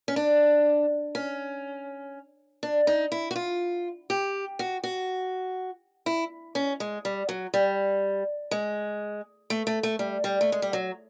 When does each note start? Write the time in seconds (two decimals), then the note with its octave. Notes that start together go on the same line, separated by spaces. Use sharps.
0.08 C#4
0.16 D4
1.15 C#4
2.63 D4
2.87 D#4
3.12 E4
3.31 F#4
3.36 F4
4.10 G4
4.59 F#4
4.84 F#4
6.06 E4
6.55 C#4
6.80 G#3
7.05 G3
7.29 F#3
7.54 G3
8.51 G#3
9.50 A3
9.67 A3
9.83 A3
9.99 G3
10.24 G3
10.41 A3
10.52 G#3
10.62 G3
10.73 F#3